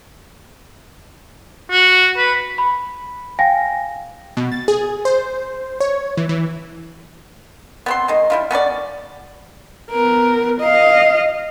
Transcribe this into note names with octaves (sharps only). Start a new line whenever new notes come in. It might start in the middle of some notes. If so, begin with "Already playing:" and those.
F#4
B4
B5
F5 G5 G#5 A#6
B2
A6
G#4
C5
C#5
E3
E3
B3 C4 C6
D#3 G#3
G3 E4 F4
B3 C#4 A#4 D5
B3 A#4
D#5 F5